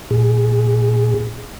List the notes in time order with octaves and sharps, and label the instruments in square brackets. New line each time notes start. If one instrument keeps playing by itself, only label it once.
[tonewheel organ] A#2 G#4